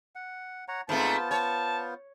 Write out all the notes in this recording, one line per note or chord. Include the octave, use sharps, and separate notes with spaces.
F#5
C#5 F#5 A#5
G#2 A3 B3 C4 F4 C5 A5
C#5 A5